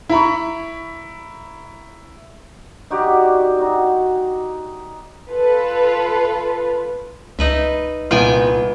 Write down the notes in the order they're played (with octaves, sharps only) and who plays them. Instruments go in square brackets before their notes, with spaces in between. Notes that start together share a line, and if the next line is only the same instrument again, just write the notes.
[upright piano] E4 A#5 B5 C#6
[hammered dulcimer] D#4 F#4 G4 D5
D#4 F#4
[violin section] F4 A4 B4
[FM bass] C#2 [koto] D#4 B4 E5
[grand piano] C2 A#2 [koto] B3 G5 G#5 [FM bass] F4